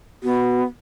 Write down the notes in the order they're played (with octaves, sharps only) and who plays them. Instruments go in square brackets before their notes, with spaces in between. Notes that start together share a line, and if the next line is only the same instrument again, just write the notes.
[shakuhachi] B3 [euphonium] F#4